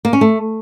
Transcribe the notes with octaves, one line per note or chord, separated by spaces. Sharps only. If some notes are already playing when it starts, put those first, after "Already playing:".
A#3
C#4
A3